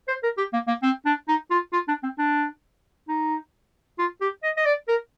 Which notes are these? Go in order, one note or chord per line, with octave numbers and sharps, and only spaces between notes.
C5
A#4
G4
A#3
A#3
C4
D4
D#4
F4
F4
D4
C4
D4
D#4
F4
G4
D#5
D#5
D5
A#4